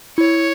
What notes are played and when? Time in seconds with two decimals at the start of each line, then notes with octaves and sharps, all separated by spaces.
0.18 E4 C#5